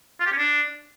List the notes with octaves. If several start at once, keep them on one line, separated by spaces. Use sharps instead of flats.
F4
G4
C#4
D4